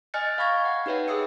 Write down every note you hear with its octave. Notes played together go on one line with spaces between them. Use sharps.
D#5 G#5 F6 F#6 A6 C#7
F5 B5 C#6 G#6 A#6
F#5
D#4 G4 B4 C#5 E5 F#5
G#4 E5 D#6 E6 C#7